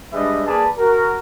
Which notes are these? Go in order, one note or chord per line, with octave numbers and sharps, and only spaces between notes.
G3 G#3 D4 B4 D#5 E5
A#3 G#4 B4 D5 A5
F#4 A#4